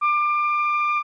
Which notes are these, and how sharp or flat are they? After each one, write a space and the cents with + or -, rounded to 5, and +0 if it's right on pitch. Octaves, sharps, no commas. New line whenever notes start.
D6 +25